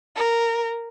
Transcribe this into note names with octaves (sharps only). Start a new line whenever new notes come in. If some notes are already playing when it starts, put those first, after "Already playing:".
A#4